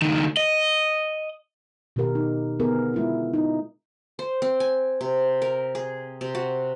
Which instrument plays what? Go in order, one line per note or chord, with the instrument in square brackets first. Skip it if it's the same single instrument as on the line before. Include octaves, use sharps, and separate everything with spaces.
[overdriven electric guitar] C#2 D#3
D#5
[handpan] B2 D#3 G4 A#4
D#4
D3 B3 G#4 A#4
G#3 E4 F4
D#4
[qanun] C5
C4
G#5
C3
A#4
G#4
C3
F#4